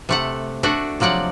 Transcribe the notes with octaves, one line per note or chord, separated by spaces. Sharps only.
C3 A3 F#5
A3 D4 F#4
C3 F3 F#3 D5 F#5